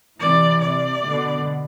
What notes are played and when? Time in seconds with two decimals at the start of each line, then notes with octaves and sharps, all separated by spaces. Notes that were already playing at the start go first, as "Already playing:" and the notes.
0.20 C3 E3 D5
0.62 C3 D5
1.04 B2 D3